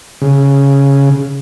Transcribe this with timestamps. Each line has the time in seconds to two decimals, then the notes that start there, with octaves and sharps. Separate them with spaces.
0.21 C#3